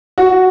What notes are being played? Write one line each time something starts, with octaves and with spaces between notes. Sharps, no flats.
F#4